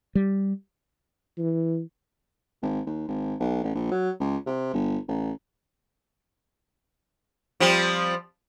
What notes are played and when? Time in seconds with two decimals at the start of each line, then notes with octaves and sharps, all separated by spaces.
0.15 G3
1.38 E3
2.62 G#1
2.86 D#2
3.08 G#1
3.40 B1
3.64 A1
3.75 A#1
3.91 F#3
4.20 C#2
4.46 C3
4.73 G1
5.08 A1
7.60 F3 G3 C4